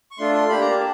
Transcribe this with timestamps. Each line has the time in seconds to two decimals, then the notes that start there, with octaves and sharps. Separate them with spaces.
0.11 C#6
0.18 A3 D4 F4 C6
0.35 C6
0.49 A#3 D4 G4 B5
0.61 A#5
0.70 A5